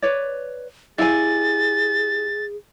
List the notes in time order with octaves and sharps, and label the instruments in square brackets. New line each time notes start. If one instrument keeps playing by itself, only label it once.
[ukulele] B4 C#5 D5
[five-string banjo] G3 E4 [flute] G#4 [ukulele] F5 G#5 [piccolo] A6